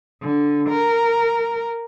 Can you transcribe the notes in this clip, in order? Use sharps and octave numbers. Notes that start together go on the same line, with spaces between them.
D3
A#4